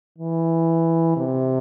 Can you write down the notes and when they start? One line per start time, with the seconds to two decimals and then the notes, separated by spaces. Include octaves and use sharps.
0.19 E3
1.17 C3